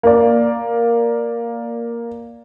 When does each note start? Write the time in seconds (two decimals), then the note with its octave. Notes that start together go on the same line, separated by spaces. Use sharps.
0.03 A#3 D5